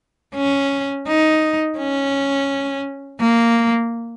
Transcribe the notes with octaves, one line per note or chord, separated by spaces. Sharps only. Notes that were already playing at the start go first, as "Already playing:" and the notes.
C#4
D#4
C#4
A#3